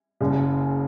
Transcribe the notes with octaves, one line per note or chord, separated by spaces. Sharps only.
F#1 F#2 C#3